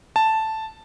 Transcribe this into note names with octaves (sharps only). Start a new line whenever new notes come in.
A5